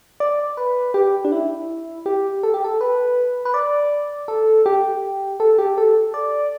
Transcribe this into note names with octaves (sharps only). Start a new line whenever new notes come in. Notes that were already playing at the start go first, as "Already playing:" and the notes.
D5
B4
G4
D4
E4
G4
A4
G4
A4
B4
B4
D5
A4
G4
A4
G4
A4
D5